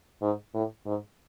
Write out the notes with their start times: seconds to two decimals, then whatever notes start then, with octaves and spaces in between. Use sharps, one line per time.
0.22 G#2
0.54 A2
0.86 G#2